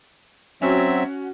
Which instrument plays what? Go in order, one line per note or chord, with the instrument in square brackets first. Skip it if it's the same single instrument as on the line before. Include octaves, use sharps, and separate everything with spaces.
[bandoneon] F#3 C4 E5 [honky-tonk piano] C#4 F#4